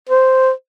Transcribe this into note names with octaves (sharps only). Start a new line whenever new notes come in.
C5